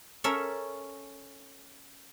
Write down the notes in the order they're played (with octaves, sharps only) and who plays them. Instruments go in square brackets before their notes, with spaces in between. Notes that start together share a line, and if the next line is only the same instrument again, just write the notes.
[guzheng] C#4 A4 A#4 E5